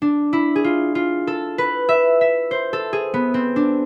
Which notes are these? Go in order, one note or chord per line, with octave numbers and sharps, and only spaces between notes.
D4
E4
G#4
F4
F4
A4
B4
E5
E5
C5
A4
G#4
B3
C4
D4